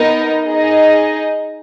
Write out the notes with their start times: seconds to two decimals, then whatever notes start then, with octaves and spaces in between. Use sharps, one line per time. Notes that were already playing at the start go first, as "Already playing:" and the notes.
Already playing: B3 D#4 A#4 D#5
0.45 D#4 G#4 D#5